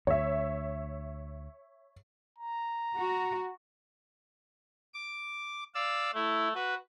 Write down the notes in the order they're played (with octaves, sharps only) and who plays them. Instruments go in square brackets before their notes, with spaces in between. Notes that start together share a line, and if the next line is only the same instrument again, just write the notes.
[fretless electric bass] D2 [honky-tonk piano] C#5 E5
[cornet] A#5
[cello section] F#4
[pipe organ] D6
D5 F5 E6
[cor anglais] A3 [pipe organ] E4
[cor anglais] F#4 [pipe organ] B4